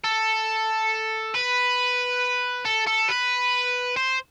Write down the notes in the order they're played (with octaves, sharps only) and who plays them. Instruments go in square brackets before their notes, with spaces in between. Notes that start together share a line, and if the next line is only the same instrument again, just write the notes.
[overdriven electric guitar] A4
B4
A4
A4
B4
C5